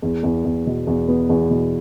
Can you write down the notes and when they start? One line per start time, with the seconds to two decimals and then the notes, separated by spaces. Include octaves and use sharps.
0.02 E2
0.23 E2
0.44 E2
0.66 B2
0.87 E2
1.08 B3
1.29 E2
1.50 B2